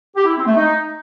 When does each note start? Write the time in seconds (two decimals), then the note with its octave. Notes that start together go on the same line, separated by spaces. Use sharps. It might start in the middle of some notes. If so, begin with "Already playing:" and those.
0.15 G4
0.26 E4
0.36 C4
0.46 A3
0.56 D#4